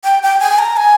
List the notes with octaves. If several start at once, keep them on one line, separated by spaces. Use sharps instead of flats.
G5
G5
G#5
A#5
G#5